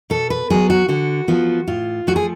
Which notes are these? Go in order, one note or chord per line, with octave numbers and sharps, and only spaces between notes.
B2 A4
B4
F#3 B3 G#4
F#4
D3 F#4
F3 B3 F4
A2 F4
F3 A3 F#4
G#4